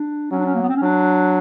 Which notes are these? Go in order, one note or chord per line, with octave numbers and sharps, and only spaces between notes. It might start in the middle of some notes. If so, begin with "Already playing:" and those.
Already playing: D4
F#3 C#4
D4
C#4
A#3
B3
C4
C#4
F#3 D4